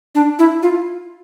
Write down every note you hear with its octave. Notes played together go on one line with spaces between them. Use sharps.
D4
E4
F4